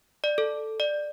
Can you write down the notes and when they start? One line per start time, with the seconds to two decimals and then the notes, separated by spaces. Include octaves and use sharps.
0.24 D5
0.38 A4
0.80 D5